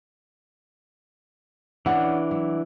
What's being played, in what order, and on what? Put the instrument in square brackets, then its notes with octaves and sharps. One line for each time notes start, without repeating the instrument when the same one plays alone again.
[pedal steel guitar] E3 D4 [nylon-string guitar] C#4 F#5
[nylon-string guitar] F#3